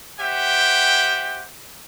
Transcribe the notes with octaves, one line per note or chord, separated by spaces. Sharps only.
G4 C5 E5 F#5 G5